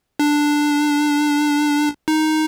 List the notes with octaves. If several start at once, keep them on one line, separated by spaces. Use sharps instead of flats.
D4
D#4